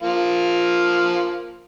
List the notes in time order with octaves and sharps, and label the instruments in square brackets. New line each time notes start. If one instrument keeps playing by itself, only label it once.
[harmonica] F3 A#3 F4